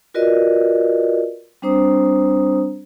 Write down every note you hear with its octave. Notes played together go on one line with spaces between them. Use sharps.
F4 F#4 A#4 B4 D5 D#5
G3 C4 D4 C5 A#5 D#6